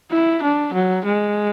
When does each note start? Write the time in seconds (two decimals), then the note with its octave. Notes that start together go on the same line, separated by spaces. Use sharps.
0.11 E4
0.42 D4
0.73 F#3
1.04 G#3